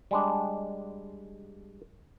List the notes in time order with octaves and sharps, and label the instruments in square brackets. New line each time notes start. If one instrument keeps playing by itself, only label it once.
[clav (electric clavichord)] G3 G#3 D4